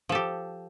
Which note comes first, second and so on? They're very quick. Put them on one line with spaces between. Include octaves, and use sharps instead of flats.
F3 A4 G4